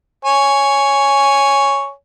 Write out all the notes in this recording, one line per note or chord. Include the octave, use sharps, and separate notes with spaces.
C#5 G#5